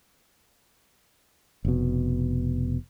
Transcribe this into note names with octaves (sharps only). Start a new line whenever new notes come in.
F1 B2